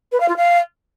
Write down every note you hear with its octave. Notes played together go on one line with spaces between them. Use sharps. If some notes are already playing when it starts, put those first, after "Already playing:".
B4
F5
F4
F5